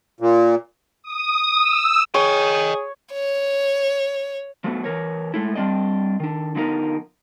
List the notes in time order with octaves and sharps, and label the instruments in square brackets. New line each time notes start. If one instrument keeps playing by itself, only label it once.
[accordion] A#2
[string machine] D#6
E6
[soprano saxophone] G#4 [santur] C#5 [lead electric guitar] D#5 G5
[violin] C#5
[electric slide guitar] F3 F#3 A3 B3
E3 A#4 C#5
G#3 A3 E4
G3 C4 D4 D5 D#5
D#3 D4
D3 F3 B3 D#4 A#4